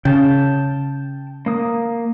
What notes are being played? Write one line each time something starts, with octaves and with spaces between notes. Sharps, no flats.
C#3 G5 A5
A#3 D#6